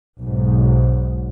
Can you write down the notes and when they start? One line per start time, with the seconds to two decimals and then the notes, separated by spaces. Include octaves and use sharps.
0.19 B1 G#2